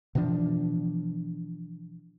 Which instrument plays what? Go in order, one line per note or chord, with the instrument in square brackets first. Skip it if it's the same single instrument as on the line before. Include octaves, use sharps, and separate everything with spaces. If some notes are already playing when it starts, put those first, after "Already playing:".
[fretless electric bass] B2 E3 F3 D4